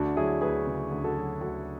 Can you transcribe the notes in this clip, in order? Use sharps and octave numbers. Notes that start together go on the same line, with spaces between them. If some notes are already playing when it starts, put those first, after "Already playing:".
Already playing: D2 D4 F#4
F#3 E4 G#4
D2 G#4 B4
C#3
D2
F#4 A4
F#3
D2 F#4 A4